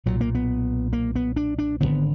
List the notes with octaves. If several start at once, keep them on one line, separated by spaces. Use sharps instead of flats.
B1 A#2 F#3
A#3
B3
A#3
B3
D4
D4
G#1 F#2 D3 B3